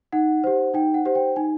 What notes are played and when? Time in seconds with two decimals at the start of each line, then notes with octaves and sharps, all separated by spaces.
0.12 D#4 F#5
0.44 G4 C5
0.74 D#4 G5
0.94 F#5
1.05 G4 C5
1.15 G5
1.36 D#4 G#5